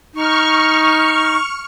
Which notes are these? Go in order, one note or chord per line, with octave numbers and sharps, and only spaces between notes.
D#4 C#6 F6